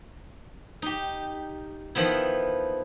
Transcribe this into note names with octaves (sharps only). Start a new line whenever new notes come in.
D#4 G4
D#3 F3 B3 E4